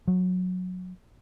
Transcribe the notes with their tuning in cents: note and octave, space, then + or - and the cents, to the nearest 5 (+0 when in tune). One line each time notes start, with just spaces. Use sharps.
F#3 -20